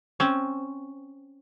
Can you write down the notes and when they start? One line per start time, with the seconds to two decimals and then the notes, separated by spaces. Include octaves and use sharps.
0.20 C4 C#4